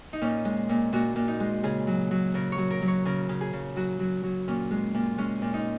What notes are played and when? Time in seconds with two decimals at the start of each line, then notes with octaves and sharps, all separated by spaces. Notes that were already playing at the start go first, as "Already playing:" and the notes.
0.13 D#4
0.22 A#2 C#4
0.45 G#3
0.69 A#2
0.93 A#2 F#4
1.16 A#2
1.28 D#4
1.40 G#3
1.63 C#3 G#4
1.87 F#3
2.11 F#3
2.34 C#3 A#4
2.52 C#5
2.58 F#3
2.71 A#4
2.82 F#3
2.88 C#5
3.05 C#3 A#4
3.29 C#3
3.41 G#4
3.53 C#3
3.76 F#3 F#4
4.00 F#3
4.23 F#3
4.48 A#2 C#4
4.71 G#3
4.95 A#2
5.18 G#3 C#4
5.42 A#2
5.54 D#4